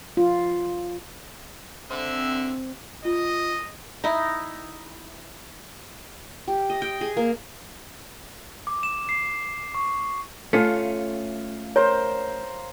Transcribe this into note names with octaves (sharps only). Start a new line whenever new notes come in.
F4
D3 C4 E5
F4 D#5
D#4 E4
G4
D#5
G5
G#4
A#3
D6
E7
C7
C#6
A3 C#4 F4 F5
A#4 C5 C#5